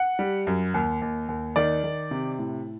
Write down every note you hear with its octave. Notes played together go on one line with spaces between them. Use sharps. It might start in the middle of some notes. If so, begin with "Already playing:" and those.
Already playing: F#5
G3
F#2
D#2
D#2
D#2
D#3 D5
D#3
C3
A2